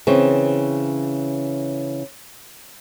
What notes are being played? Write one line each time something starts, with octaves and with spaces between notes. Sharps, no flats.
C#3 E3 C4